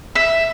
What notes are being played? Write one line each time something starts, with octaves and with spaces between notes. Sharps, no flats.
E5